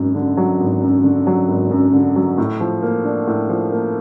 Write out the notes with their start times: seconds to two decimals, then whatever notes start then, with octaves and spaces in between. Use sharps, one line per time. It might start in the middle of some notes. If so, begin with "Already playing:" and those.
Already playing: G#1 F#2
0.15 D3
0.37 F#3
0.60 G#1
0.82 F#2
1.04 D3
1.27 F#3
1.49 G#1
1.71 F#2
1.94 D3
2.16 F#3
2.38 A2
2.60 F3
2.82 A#3
3.04 D4
3.27 A2
3.49 F3
3.72 A#3